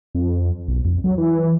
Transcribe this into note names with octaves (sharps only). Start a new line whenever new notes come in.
F2
B1
F2
F#3
E3